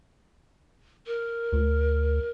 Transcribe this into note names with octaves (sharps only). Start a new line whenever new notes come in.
A#4
D2